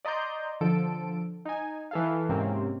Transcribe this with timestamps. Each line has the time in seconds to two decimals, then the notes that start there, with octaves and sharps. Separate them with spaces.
0.05 D5 D#5 A#5 C6 G6
0.61 D3 F3 A4 D7
1.45 D#4 G#5
1.91 E3 A4 F5
2.29 G#2 C3 A#3 C4 C#4